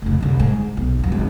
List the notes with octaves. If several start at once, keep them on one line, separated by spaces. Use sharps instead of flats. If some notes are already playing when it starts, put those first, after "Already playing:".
F1 C#3
C2 D3
G#2
B1
F#2 E3
G#1